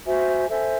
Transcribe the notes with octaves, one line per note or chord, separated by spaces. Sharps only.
F#4 C5 E5 G#5
A4 C5 E5 G#5